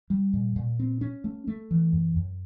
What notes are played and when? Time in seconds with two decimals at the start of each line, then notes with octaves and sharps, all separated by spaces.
0.10 G3
0.33 A#2
0.56 A#2
0.79 C4
1.01 C#4
1.24 A3
1.47 A3
1.71 E3
1.93 F#2
2.16 F#2